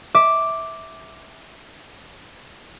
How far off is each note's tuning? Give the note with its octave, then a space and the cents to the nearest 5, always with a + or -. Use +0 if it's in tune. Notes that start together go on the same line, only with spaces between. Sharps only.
E5 -15 D6 +0